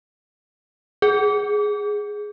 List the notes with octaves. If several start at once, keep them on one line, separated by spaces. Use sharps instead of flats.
G#4